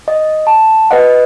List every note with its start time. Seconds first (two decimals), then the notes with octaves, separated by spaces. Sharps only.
0.08 D#5
0.47 A5
0.91 B4 D#5 F#5